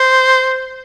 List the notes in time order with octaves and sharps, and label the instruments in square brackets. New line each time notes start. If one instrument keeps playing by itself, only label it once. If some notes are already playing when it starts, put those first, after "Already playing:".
Already playing: [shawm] C5